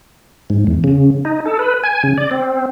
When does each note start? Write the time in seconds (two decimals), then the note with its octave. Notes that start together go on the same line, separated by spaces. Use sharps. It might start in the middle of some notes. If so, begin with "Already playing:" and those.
0.50 G#2
0.67 E2
0.84 C#3
1.25 D#4
1.46 A4
1.59 B4
1.84 G#5
2.04 C#3
2.18 D5
2.31 C4